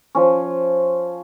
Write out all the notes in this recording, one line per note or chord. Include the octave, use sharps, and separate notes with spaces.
F3 C#4